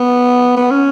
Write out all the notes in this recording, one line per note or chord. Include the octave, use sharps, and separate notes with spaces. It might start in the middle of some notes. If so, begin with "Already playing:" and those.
Already playing: B3
B3
C#4